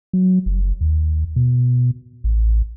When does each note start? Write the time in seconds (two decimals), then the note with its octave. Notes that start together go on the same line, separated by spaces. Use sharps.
0.13 F#3
0.46 F#1
0.81 D#2
1.36 B2
2.24 A1